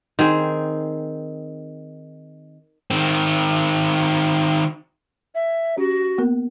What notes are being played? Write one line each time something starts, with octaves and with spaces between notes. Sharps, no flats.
D#3 C4 G#4
D#3 C4
E5
C#4 F#4 G4
A#3 B3 A#4